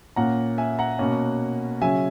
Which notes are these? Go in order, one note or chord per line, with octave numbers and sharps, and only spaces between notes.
A#2 A#3 C#4 F#5 A#5
E5 G#5
F#5 A#5
B2 A#3 C#4
C#3 F#3 C#4 E5 G#5